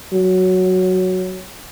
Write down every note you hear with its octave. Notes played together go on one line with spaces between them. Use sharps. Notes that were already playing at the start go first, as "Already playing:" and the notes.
F#3